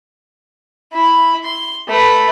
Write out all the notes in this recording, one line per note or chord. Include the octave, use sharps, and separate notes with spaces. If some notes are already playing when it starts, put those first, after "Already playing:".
E4 B5
C6
A3 B4